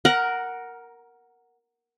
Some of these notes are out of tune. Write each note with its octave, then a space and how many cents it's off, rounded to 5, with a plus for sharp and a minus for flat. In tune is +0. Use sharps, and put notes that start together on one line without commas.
A#4 +0 F#5 +0 A#5 +25